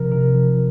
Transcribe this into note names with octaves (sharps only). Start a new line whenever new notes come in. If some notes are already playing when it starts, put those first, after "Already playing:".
Already playing: C3 F3 A#4
C3 A#4
F3